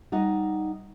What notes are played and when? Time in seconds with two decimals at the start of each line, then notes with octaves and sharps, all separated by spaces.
0.12 G3 D#4 D#5 F#5